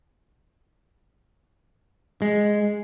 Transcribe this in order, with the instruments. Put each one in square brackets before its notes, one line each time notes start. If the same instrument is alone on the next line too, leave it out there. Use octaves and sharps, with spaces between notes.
[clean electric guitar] G#3